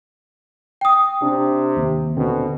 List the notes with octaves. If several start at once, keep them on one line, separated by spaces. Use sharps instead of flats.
G5 D#6
C3 D4
D#2
B2 D3 C4